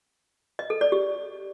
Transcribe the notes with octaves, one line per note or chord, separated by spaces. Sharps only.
D#5
A4
D5
G4